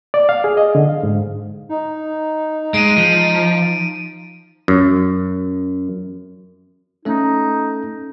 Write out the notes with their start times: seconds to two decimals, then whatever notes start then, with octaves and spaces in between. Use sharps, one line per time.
0.14 D5
0.29 F5
0.44 G#4
0.57 D#5
0.75 D3
0.89 F5
1.03 G#2
1.69 D#4
2.74 G#3 D7 D#7
2.97 F3
4.68 F#2
7.05 A3 C#4 D#4 A4